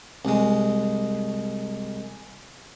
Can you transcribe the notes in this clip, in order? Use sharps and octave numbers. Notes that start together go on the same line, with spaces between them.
C2 G#3